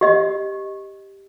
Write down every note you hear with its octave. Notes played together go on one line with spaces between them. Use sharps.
G4 D#5